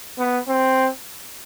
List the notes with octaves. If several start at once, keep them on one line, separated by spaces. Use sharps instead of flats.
B3
C4